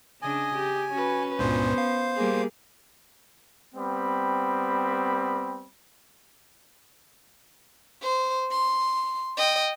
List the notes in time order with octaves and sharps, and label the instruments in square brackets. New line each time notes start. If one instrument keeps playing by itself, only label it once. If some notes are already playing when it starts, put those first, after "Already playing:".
[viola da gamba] C#3 D4 [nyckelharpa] D#5 [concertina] G#5
[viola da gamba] G4
[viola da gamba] C#4 [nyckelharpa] F#4 B4
[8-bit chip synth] C#2 G2 A#2 [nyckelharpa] B3 [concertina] C5
[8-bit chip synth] F5
[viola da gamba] G3 A#3 G#4
[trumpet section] G3 B3 C4 B5
[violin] C5
C6
D#5 G5